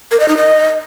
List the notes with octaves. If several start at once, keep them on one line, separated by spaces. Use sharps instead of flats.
A#4
D#5
D#4
D#5